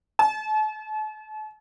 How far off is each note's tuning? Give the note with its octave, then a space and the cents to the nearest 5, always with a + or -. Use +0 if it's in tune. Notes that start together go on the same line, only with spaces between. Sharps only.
A5 -40